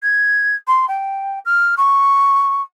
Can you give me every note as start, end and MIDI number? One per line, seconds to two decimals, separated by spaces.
0.02 0.55 92
0.67 0.86 84
0.88 1.39 79
1.45 1.75 89
1.77 2.61 85